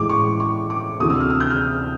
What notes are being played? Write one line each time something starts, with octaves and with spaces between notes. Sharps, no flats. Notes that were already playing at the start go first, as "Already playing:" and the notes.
Already playing: A2 E3 G#3 D6
C#6
C#6
D6
D2 C3 E3 A3 D#6
E6
F6
E6
G6
F6